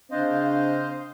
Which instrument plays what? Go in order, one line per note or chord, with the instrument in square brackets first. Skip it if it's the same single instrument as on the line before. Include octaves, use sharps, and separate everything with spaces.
[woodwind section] C#3 D4 [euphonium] C4 [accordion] C5 [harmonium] D#5 F5